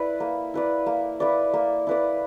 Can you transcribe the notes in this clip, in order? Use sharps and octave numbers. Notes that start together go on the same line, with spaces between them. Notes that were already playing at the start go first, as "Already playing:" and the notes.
Already playing: E4 B4 D5
A#3
E4 B4 D5
A#3
E4 B4 D5
A#3
E4 B4 D5